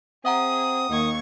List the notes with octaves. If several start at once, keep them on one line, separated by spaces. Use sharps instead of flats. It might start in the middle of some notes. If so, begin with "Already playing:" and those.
C4 G#4 E5 F#5 A#5 D#6
D#2 D#3 C#6 G#6